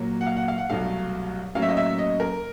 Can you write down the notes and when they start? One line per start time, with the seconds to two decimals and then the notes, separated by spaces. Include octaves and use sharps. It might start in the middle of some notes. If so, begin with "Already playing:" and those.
Already playing: A#2 F#3 A#3
0.21 F#5
0.27 F5
0.37 F#5
0.48 F5
0.58 F#5
0.70 C2 B2 F#3 A3 F5
1.55 A2 F#3 A#3 C#4 F5
1.62 E5
1.69 D#5
1.77 E5
1.98 D#5
2.20 A#4